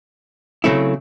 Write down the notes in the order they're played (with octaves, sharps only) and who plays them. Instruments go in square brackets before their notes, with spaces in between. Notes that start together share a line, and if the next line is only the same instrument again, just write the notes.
[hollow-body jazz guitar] C#3 F#3 A3 C4 E4